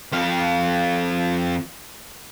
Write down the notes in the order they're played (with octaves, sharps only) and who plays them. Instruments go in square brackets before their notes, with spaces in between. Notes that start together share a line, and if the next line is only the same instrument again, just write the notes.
[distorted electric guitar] F2 F5